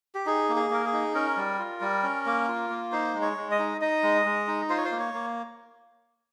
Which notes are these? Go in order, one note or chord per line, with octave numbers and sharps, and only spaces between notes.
G4
D#4 G#4
A#3
G#4
A#3 A#4
G#4
D#4
C#4 A#4
G3
F4
G3
C#4
A#3
F4
A#3
D#4 C5
G#3
C#5
G#3
D#5
D#4
D#4 D#5
G#3
G#3
D#4
F4 C5
C#5
C5
A#3
C#5
A#3